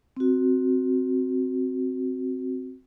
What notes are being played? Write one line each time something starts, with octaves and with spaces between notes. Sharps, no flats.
C4 F#4